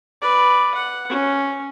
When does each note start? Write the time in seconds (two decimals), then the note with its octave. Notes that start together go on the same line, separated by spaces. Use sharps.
0.22 B4 D5
0.75 F#5
1.09 C#4